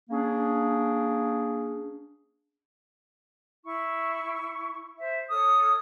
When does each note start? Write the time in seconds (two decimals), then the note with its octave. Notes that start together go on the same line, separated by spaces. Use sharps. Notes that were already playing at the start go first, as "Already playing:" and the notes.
0.10 A#3 C#4 D4 G#4
3.63 E4 C#6
4.98 C5 E5
5.30 A4 C#5 D#6 F6